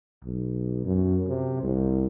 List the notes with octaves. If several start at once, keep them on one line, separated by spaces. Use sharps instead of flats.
B1
F#2
C3
C2